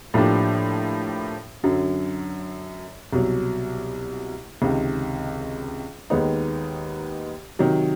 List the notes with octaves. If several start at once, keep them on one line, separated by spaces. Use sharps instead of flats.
A2 F3 A#3 D4 G4
F#2 D3 F#3
C2 B2 F#3
C#2 C3 D#3
D#2 D#3 G#3 B3 D#4
C3 D#3 F#3